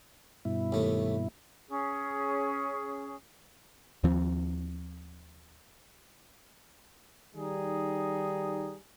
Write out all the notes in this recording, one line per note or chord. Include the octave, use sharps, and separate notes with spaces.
G2 B2 E4
D#2 A3
C#4 G#4
D#2 F3 C4
D#3 G3 D#4 G#4